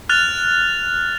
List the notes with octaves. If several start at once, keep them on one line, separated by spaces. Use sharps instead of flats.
F6 F#6 A6 F7